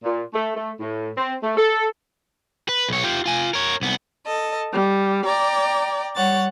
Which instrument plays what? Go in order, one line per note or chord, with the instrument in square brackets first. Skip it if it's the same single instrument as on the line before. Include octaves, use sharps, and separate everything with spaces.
[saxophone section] A#2
A3
A3
A2
C4
A3
A4
[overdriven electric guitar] B4
B1 C#5
F4 G4
F4 G#5
A#4 C#5
C2 B3
[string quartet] A4 D#5
G3
D5 G5 A#5
G3 C#5 F#5 A6